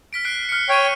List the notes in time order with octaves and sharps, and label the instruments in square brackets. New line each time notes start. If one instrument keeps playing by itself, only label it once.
[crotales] F6 B6 D7
F#6 C7 D7
F6 C#7
[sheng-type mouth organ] C#5 G5 [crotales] F6 D#7